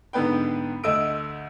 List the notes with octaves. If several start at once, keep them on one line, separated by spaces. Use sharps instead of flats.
G#2 D3 B3 B4 G5
D2 A3 D#5 D#6 E6 D7